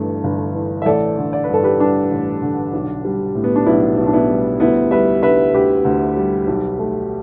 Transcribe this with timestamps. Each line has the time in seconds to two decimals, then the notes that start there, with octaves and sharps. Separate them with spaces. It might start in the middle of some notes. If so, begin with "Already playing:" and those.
Already playing: G1 G2 E3 A3
0.24 G1
0.55 E3
0.82 E5
0.85 A1 A4 D5
1.18 D3
1.33 D5
1.44 G2 B4
1.53 A4
1.64 G4 B4
1.79 G3 D4
2.11 A1
2.42 D3
2.73 B1
3.05 G3
3.35 A2
3.44 B3
3.56 D4
3.66 B1 B3 E4
3.98 B1
4.07 D4
4.13 B3 E4
4.29 G3
4.60 D2 B3 E4
4.91 G3 B4 E5
5.23 D3 B4 E5
5.54 D2 G4 B4
5.85 D2
6.17 G3
6.47 B1
6.79 A3